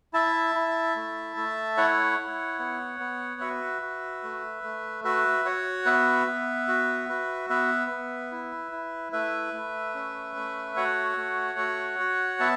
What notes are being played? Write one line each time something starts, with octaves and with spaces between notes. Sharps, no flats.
E4 E5 A5
E4
A3
A3
E4 C#5 F#5
E4
B3
B3
F#4 B4 E5
F#4
A3
A3
F#4 B4 E5
F#4 C#5 F#5
B3 B4 E5
B3
F#4
F#4
B3 B4 E5
B3
E4
E4
A3 B4 E5
A3
C#4
A3
F#4 C#5 F#5
A3
F#4
F#4
B3 E5 A5